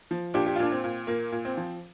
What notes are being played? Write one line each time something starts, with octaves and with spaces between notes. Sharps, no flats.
F3
A#2 D4 G4
G4
F4
A#2 D4
C4
A#2
A#2 A#3
A#2
C4
F3